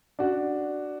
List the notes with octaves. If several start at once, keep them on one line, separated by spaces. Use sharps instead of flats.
D4 F#4